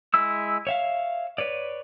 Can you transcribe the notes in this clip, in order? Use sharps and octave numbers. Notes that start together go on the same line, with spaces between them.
G#3 E4 E6
C#5 E5 F5
B4 C#5 D5